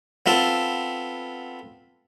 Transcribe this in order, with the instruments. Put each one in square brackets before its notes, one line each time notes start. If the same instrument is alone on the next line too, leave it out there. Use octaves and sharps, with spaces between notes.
[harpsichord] B3 C4 F4 A4